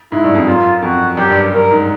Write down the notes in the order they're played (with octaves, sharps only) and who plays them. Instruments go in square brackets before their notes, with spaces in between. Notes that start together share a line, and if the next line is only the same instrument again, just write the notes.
[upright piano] G#2 [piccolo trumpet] E4
[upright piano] G2
F2
[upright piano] F#2 [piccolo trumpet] F4
[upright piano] F2 [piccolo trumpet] F#4
[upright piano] F#2 [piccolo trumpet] G4
[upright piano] G2
F#2
[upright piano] G2 [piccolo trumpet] A#4
[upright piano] G#2